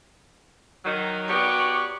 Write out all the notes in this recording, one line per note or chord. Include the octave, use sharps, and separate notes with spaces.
D#3 F#3
F#3 B3 G4 D5 C#6